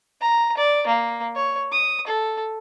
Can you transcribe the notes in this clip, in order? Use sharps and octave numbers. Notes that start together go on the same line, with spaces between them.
A#5
D5
A#3
C#5
D#6
A4